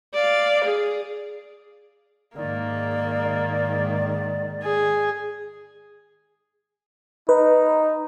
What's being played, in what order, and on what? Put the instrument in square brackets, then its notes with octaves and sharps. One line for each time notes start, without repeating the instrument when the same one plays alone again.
[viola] D5 F5
G#4
[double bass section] G#2 D#3 [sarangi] A#3 [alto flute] D5
[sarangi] G#4
[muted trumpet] D#4 [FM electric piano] B4